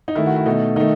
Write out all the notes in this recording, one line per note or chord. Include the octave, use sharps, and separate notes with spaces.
D#4
D#3 A3 E4
F#4
E4
B2 A3 D#4
D#3 A3 D#4